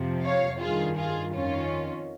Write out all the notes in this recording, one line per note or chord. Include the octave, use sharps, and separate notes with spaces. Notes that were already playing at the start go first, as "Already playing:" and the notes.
Already playing: F2 C3 F3
C#5 F5
G2 D#3 F4 G#4
F4 G#4
F2 D#3 C#4 F4